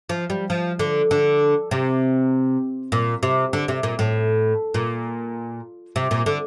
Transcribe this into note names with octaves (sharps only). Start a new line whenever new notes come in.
F3
G3
F3
D3
D3
C3
A#2
C3
D3
C3
A#2
A2
A#2
C3
A#2
D3